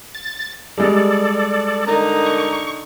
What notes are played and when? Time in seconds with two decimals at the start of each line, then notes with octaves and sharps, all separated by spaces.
0.15 A6
0.78 G3 G#3 A4 D5
1.87 D3 D#4 A#4
2.26 C#6